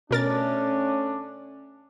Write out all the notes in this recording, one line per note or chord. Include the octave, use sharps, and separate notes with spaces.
B2 A3 C#4 D4 A#4 A6